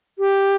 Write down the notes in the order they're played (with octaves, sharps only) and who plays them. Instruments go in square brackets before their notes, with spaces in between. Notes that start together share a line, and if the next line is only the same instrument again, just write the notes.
[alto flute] G4